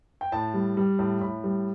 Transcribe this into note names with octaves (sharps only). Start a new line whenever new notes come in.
G5
A2 A5
G3
G3
A2
A2 B5
G3